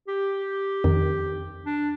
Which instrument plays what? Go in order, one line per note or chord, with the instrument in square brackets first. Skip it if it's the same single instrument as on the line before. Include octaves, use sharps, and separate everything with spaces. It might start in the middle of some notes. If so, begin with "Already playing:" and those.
[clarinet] G4
[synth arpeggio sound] F2 D#3
[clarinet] D4